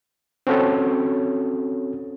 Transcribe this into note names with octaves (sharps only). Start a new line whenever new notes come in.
C4 C#4 F#4 A4 C#5